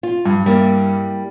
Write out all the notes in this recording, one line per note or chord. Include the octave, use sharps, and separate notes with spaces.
F4
G2
G3 A#3 E4